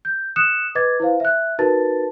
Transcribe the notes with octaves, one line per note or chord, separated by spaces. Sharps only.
G6
D#6 F#6 C#7 E7
B4 D#5 D6 G#6 A6
E4 B4 C5 F5
E5 F#6
D#4 F#4 A#4 B4 A5 A6